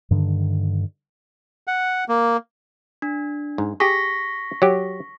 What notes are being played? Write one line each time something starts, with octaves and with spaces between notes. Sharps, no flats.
G2 D3 D#3
F#5
A#3
D4
G#2
G4 G#4 C#6 A#6 B6
F#3 G4